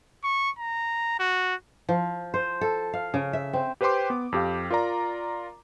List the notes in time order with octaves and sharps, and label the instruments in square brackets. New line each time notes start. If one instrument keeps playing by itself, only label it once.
[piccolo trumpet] C#6
A#5
F#4
[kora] F3
C5
A4
F5
C#3
E5
C4
[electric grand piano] G4 B4 C5 G5 C6 D6
B3
F2 G4 F5
F4 A#4 D5 A#5